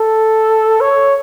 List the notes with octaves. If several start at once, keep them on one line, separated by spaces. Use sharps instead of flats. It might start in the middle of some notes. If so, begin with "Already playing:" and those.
Already playing: A4
C#5